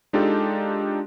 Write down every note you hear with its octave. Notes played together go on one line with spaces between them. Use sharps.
G#3 D4 D#4 F4 G4 A4